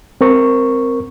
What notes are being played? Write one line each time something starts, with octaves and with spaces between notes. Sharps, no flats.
C4 A#4 C#6